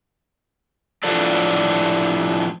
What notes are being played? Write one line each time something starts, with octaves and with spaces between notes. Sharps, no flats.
A2 F3 D4 F4 A4 D5